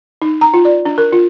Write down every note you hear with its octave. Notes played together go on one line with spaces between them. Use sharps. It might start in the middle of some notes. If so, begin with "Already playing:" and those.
D#4
A#5
F4
D5
D4
A#4
F4